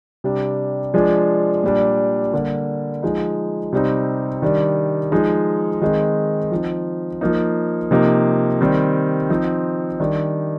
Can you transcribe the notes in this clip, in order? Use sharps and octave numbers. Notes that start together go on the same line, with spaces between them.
C3 G3 D4
F3 G#3 D4
A#2 G3 D4
D3 G3 A#3
F3 G#3 D#4
C3 G3 C4 D#4
D#3 G3 D4
F3 G#3 D#4
D#3 G#3 C4 D#4
F3 C4 D#4
F3 A#3 D#4
C3 F3 A#3 D#4
D#3 G3 C4
F3 C4 D#4
D#3 G3 D4